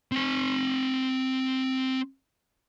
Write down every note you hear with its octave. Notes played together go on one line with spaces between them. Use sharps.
C4 G#5